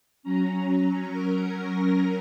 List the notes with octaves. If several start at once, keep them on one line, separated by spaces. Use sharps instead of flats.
F#3 C#4 A#5
A#4